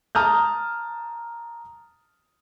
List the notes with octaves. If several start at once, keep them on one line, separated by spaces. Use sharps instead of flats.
A5 A#5 D#6 F6 G6